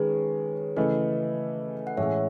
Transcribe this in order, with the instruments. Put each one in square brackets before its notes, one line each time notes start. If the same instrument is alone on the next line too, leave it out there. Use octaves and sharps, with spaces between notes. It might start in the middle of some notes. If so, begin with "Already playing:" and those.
Already playing: [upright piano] D#3 G#3 C#4 [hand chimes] G#4 B4
[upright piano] C#3 E3 A3 [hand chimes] B4 D#5
[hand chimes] F#5
[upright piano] A2 E3 G#3 C#4 [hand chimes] C#5 E5